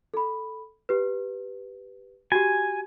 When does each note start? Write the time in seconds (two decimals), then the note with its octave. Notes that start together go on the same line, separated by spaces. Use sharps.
0.14 A4 B5
0.89 G4 B4
2.32 F#4 G4 G#5